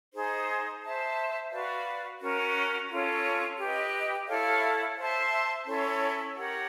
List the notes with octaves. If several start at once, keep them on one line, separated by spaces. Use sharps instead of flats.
D#4 G#4 C5
C5 E5 A5
F#4 B4 D5 F5
C#4 F#4 A#4
C#4 F4 A4 C#5
G4 B4 D#5
E4 A4 C#5 F5
C5 E5 A5 C6
C#4 E4 A4 C#5
G4 A#4 C#5 F#5